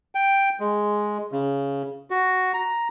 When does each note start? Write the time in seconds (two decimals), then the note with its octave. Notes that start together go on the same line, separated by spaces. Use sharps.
0.15 G5
0.60 G#3
1.32 C#3
2.11 F#4
2.54 A#5